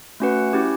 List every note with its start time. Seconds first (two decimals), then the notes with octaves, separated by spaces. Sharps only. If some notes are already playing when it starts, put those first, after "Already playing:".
0.20 A3 C#4 F#4 B4 F#5
0.53 C#4 E4 G4